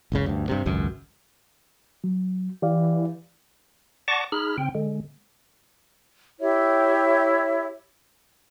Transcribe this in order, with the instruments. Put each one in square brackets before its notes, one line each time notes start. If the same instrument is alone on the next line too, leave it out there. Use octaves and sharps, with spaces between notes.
[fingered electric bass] F#1 C#2 C#3
D2 G2
G2 C3
G#1 C#2 F#2
[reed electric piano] F#3
[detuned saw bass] E3 [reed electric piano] G4 D5 F5
[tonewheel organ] D5 F#5 A5 C#6 D6 A#6
D#4 G#4 B5 F6
C#3 C4 G5
D3 G#3
[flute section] E4 G4 C#5 E5